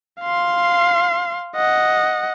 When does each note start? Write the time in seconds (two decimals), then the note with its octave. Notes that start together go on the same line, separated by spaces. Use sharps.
0.21 F5 C6
1.56 D#5 F#5